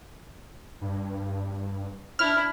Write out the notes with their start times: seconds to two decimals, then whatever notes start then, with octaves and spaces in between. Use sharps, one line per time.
0.81 G2
2.19 D4 E4 F6